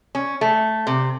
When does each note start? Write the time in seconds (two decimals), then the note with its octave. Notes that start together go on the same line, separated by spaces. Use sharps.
0.15 C#4
0.41 A3
0.87 C3